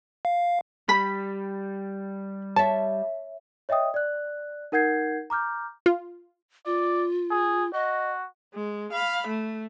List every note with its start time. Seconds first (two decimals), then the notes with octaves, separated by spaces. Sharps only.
0.25 F5
0.89 G3 B5 B6
2.56 C#5 E5 A5
3.69 C#5 D#5 E5 G5 D#6
3.94 D5 F#6
4.72 D#4 A#4 F#5 G6 G#6 C7
5.30 A#5 D6 F6 G6
5.86 F4
6.66 F4 D5
7.31 G#4
7.73 F#4 D#5
8.54 G#3
8.93 F5 B5
9.27 A3